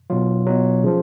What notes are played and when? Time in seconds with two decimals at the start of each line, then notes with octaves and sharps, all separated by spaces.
0.10 B2 F#3 F4
0.46 B2 F#3
0.84 C#3 F3